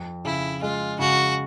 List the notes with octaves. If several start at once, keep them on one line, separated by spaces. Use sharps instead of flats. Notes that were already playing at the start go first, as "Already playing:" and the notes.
Already playing: F2
C#3 E4
G#3 F4
C#3 F#4